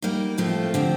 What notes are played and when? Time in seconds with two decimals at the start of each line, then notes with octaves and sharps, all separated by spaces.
0.02 G3 A#3 D#4
0.38 A2 F3 A3 C4 F4
0.74 D3 F3 C4 G4